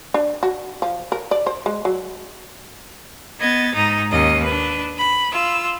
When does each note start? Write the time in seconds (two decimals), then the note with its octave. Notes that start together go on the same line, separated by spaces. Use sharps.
0.14 D4
0.43 F#4
0.82 F3
1.12 A#4
1.31 D5
1.46 C5
1.66 G#3
1.85 F#3
3.39 B3 D#5 G#6 A6
3.75 G#2 D#4 A#5 D#6
4.11 D#2 A#3 C#4 D#5
4.44 D4 B4
4.97 B5
5.31 F4 E6